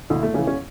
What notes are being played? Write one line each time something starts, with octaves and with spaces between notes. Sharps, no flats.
D2 E4
A3
C#3 E3 C#4
C#4